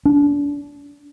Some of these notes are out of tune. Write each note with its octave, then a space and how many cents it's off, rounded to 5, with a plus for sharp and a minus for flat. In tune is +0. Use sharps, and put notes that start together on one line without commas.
D4 -30